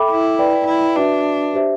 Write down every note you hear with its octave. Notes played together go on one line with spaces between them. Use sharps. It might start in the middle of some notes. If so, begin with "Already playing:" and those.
Already playing: A4 E5 G5 B5 D6
E4
B4 D5 G5
E4
D4 F#4 B4 E5
G4 C5 E5